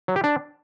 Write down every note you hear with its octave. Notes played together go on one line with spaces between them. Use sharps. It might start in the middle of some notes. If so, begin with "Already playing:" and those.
F#3
G4
D4